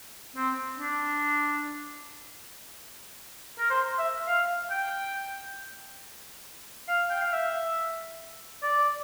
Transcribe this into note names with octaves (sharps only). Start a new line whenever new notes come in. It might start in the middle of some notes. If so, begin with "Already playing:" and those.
C4
D4
A#4
C5
E5
F5
G5
F5
G5
F5
E5
D5